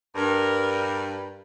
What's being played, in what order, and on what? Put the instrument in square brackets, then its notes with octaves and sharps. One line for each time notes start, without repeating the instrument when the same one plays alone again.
[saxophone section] G2 [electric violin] A#4